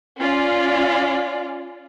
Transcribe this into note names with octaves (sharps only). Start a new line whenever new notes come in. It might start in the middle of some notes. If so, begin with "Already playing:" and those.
C#4 F4 D5